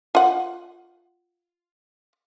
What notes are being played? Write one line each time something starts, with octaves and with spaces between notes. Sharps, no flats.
F4 F#5